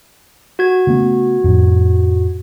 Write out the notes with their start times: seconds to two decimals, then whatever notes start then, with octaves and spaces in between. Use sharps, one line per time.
0.59 F#4 G#6
0.87 C#3 A3 B3
1.44 F2 A2